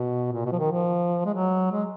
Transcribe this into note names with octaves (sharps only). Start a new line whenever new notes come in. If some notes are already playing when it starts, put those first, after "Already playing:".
Already playing: B2
A#2
B2
F3
D#3
F3
G#3
F#3
G#3